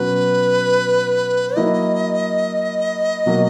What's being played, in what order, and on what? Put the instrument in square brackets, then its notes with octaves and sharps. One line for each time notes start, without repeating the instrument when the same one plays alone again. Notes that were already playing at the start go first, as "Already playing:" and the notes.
Already playing: [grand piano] B2 F#3 C#4 [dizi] B4
[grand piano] F#3 A#3 E4 [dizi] D#5
[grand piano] B2 F#3 A#3